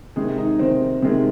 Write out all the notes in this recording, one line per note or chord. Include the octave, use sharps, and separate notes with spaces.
C3 D#3 G#3 D#4
D#4
C3 D#3 G#3 C4
C3 D#3 G#3